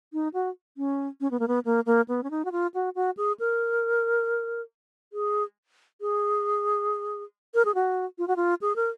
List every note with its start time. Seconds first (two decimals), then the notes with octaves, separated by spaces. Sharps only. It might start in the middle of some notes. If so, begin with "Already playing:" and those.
0.13 D#4
0.34 F#4
0.77 C#4
1.21 C#4
1.31 B3
1.40 A#3
1.48 B3
1.65 A#3
1.86 A#3
2.08 B3
2.23 C#4
2.31 D#4
2.45 F#4
2.52 F4
2.74 F#4
2.95 F#4
3.17 G#4
3.40 A#4
5.13 G#4
6.01 G#4
7.55 A#4
7.65 G#4
7.75 F#4
8.18 F4
8.28 F#4
8.36 F4
8.61 G#4
8.76 A#4